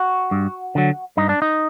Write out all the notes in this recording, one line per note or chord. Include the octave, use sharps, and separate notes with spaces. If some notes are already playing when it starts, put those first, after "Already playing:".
Already playing: F#4
G2
D3 F#3
G2 D#4
D4
D#4